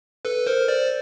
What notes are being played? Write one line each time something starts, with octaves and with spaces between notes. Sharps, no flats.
A4 B4
A#4 C5
C5 D5